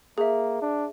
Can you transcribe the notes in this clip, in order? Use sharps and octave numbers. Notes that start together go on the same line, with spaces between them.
A#3 G#4 E5
D4